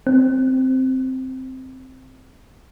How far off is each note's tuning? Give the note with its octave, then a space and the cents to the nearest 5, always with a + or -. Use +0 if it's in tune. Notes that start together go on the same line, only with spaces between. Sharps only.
C4 -5